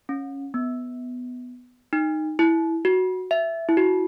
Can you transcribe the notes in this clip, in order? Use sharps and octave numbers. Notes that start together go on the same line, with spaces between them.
C#4
B3
D#4
E4
F#4
E5
E4
F#4